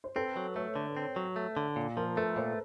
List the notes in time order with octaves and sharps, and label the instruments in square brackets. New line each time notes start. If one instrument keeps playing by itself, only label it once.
[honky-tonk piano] C5
[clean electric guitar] C4 [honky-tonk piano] A4 B4
[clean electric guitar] F#3
[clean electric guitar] A3 [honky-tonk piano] B4 C#5
[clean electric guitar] D3
C4
F#3
A3
D3
A#2
[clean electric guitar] F3 [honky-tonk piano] A#4
[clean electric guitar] A3 [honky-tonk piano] A4 B4
[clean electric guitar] A#2 [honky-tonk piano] A#4 C5